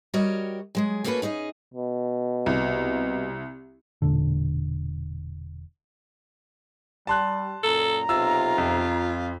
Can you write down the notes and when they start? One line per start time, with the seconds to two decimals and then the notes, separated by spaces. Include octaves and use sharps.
0.14 G3 F#4 G4 A#4 C#5 D#5
0.75 F#3 G#3 G#4
1.04 A3 A#3 C#4 F#4 A4 B4
1.22 C#4 D#4 G#4 D#5
1.74 B2
2.46 C2
4.02 E1 A#2 D3
7.07 G3 A5 C6 F#6
7.63 F#2 A#2 A4 A#5
8.09 B1 C3 F4 E6
8.58 F2